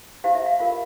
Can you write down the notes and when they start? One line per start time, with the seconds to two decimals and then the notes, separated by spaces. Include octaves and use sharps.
0.24 E4 G4 C5 F5
0.35 E5
0.46 F5
0.59 F4 A#4 F5